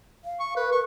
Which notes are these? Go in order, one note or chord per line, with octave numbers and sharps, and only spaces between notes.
F5
C#6
A#4 B4
A#4 C#6